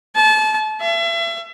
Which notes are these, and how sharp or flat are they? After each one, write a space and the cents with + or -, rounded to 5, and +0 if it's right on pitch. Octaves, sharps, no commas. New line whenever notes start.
A5 -30
E5 +35